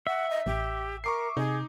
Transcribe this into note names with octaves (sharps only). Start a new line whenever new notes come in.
E5 F#5
D#5
A1 G4
A#4 C#6 D6 C7
C3 D#4 G#4